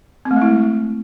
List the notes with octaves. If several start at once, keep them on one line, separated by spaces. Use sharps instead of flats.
C4
A3
G#3
E4